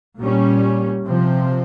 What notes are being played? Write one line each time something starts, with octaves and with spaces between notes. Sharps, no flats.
A#2 G3 C#4
C3 F3 C4